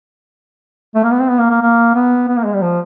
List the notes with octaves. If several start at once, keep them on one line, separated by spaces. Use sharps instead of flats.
A3
A#3
B3
C4
B3
A#3
A#3
A#3
B3
B3
A#3
G#3
G3
F3